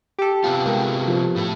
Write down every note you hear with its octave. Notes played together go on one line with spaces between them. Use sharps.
G4 A4
C3 B3 F4
G#3 A#4 G5
F3
A2 A3